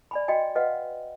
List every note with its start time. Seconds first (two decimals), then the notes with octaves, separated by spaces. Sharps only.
0.11 D5 G#5 B5
0.28 F#4 D#5 G5 G#5
0.55 F#4 B4 D#5 F5 F#5